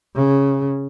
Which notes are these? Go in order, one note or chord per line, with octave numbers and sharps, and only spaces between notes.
C#3